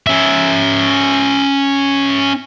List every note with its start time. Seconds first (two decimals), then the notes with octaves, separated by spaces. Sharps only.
0.07 C#4 E5